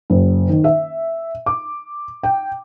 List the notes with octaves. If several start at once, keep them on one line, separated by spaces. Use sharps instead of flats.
F#1
D#3
E5
D6
G5